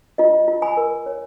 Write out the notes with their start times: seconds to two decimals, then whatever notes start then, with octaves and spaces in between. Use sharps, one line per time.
0.18 F4 D#5
0.48 F4
0.62 G#5 B5
0.77 A#4
1.06 C#5